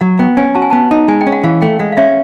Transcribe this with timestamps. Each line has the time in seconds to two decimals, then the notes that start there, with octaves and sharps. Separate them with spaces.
0.01 F#3 F#5
0.19 B3 G5
0.37 C#4 G#5
0.55 F#4 A5
0.62 G#5
0.70 B3 A5
0.91 D#4
1.08 G#3 G#5
1.21 G5
1.27 C#4
1.32 F#5
1.44 E3 F5
1.61 A3 G5
1.79 G#3 F#5
1.92 F5
1.97 C#4 E5